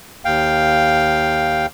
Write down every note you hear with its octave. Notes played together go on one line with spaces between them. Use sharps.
D#2 F5 G5